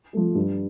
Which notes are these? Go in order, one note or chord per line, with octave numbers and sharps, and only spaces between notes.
F3 A3
G2